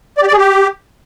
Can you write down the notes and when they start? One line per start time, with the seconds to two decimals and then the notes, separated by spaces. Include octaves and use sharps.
0.18 D5
0.23 G4
0.28 D5
0.33 G#4
0.38 G4